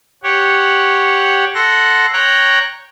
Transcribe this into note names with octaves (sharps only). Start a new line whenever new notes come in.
G4 C#5 F#5
A4 F#5 C6 A#6
C#5 G5 A#5 F#6